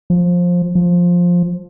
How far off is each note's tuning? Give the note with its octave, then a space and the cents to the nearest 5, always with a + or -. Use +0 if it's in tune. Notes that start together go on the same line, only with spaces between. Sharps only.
F3 +15
F3 +10